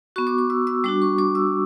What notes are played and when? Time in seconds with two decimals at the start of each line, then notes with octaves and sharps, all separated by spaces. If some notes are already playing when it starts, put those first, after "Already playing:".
0.16 B3 F#4 C#6
0.27 D6
0.38 D6
0.50 E6
0.67 E6
0.84 G3 D4 F#4 D6
1.02 C#6
1.18 D6
1.35 E6